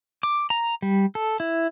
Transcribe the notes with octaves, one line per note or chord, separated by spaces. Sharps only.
D6
A#5
G3
A4
E4